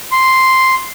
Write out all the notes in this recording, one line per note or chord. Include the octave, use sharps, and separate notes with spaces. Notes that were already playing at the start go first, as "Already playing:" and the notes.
C6